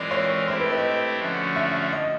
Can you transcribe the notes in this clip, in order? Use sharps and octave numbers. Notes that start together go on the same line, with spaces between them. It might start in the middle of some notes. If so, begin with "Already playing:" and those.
Already playing: E3 G#3 C4 F4 A#4 D5
C#5
A3 C4 E4 G4 C5
B4
D#5
D3 F3 A3 C#4 F#4
E5
D#5